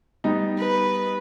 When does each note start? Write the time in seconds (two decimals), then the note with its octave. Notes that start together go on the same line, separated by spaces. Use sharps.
0.24 G3 B3 D#4
0.58 B4